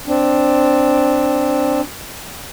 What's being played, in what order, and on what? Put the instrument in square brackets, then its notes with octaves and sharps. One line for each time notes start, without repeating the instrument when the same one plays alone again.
[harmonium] C4 D4